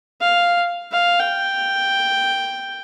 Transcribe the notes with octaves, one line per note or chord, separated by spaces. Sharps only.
F5
F5
G5